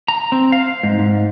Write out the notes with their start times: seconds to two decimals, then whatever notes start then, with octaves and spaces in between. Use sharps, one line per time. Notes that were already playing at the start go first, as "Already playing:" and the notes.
0.08 A#5
0.32 C4
0.52 F5
0.83 G#2
0.99 G#2